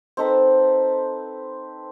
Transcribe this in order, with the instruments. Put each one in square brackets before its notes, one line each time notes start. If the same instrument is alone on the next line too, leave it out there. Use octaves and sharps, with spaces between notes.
[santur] C4 D#4 A4 B4